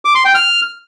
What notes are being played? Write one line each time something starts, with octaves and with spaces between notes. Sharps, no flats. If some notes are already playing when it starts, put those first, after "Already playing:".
D6
C6
G5
F6